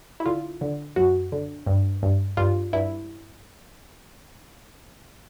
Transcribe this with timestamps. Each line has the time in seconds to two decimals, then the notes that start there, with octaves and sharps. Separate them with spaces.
0.20 E4
0.26 D3 F4
0.61 D3
0.96 F#2 F#4
1.32 D3
1.66 G2
2.03 G2
2.37 G2 F4
2.73 G2 E4